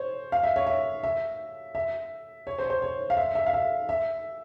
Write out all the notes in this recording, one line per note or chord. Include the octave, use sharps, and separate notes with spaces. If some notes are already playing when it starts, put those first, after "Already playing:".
Already playing: C5 C#5
F5
E5
C#5
E5
E5
E5
C#5
C5
C#5
C5
C#5
F5
E5
E5
F5
E5
E5